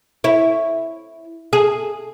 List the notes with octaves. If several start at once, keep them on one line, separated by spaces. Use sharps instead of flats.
E4 C#5
G#4